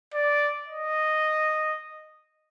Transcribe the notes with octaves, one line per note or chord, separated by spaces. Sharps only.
D5
D#5